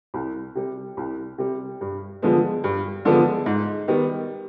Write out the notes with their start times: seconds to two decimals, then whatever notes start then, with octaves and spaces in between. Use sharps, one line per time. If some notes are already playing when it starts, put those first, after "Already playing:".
0.14 C2
0.55 C3 G3
0.97 C2
1.38 C3 G3
1.81 G2
2.22 D3 F3 G#3 B3
2.64 G2
3.05 D3 F3 G#3 B3
3.46 G#2
3.88 D#3 G3 B3